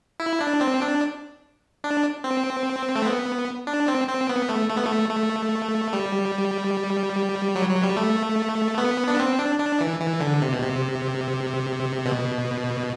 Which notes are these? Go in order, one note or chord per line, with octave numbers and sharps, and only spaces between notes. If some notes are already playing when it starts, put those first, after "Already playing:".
E4
D4
C4
D4
D4
C4
A3
B3
D4
C4
C4
B3
A3
A3
B3
A3
A3
G3
F#3
F#3
G3
A3
B3
D4
C4
D4
D4
E3
E3
D3
C3
B2
C3
B2